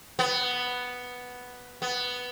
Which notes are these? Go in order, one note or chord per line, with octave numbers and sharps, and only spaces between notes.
B3
B3